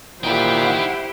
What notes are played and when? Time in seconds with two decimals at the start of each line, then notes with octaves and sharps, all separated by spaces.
0.24 A#2 D#4 E4 G4 C5 F#5 G5